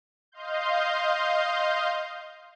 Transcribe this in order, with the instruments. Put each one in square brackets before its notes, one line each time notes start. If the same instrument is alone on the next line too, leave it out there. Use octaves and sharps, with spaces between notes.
[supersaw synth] D#5 F5 C6 G6